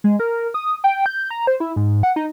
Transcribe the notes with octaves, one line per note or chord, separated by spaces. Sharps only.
G#3
A#4
D#6
G5
G6
A#5
C5
E4
G#2
F#5
D#4